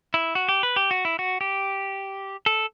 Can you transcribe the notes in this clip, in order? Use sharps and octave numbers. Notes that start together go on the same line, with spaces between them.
E4
F#4
G4
B4
G4
F#4
E4
F#4
G4
A4